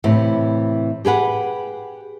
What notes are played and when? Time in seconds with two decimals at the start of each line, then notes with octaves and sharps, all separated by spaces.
0.04 A2 C3 E3
1.05 G4 G#4 B4 F#5